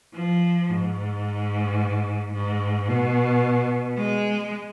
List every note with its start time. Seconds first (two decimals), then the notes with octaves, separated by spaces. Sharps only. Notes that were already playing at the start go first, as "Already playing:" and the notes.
0.14 F3
0.69 G#2
2.33 G#2
2.89 B2
3.97 G#3